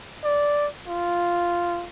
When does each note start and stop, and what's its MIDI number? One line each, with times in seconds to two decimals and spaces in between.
0.24 0.67 74
0.88 1.87 65